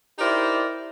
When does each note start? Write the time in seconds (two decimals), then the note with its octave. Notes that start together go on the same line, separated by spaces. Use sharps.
0.19 D#4 E4 G4 A#4 C5 D5